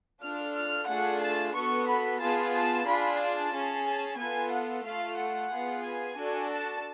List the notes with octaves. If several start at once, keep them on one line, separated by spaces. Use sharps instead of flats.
D4 F4 A4 F6
F6
A3 D4 F4 G#4 F#5
A5
B3 F#4 A4 C#6
B5
B3 F4 G#4 A5
A5
D4 F4 G#4 B5
A5
C#4 G#4
A5
B3 F4 A4 G#5
F#5
A3 F4 A4 F5
F#5
B3 F4 G#4
G#5
D4 F#4 A4
A5